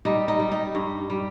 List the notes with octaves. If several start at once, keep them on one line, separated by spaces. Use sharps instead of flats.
G3 D#4
D#4
G3
D#4
G2
G3